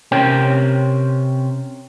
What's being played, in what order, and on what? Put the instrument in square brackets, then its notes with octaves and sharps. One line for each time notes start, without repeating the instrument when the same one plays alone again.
[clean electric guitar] C3 C#4 A#4 C5 G5